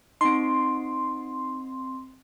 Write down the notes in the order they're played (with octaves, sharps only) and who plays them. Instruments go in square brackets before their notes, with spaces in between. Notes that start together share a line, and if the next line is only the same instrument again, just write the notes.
[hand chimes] C4 D#5 [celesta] D#4 D7 [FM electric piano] C6